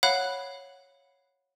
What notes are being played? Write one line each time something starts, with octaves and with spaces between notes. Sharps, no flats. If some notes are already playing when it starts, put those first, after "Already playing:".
C#5 F5 F#5 B5 F#6